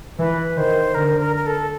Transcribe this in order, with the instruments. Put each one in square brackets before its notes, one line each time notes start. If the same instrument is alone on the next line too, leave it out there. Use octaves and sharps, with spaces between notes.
[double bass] E3 [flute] B4
[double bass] D#3 [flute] C5
[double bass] D3 [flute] A#4
[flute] A#4
A#4
A4